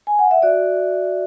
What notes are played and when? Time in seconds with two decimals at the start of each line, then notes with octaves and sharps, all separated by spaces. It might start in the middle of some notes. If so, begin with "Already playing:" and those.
0.07 G#5
0.19 F#5
0.31 E5
0.42 F#4 D5